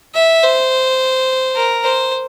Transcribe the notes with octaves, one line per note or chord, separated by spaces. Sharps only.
E5
C5
A#4
C5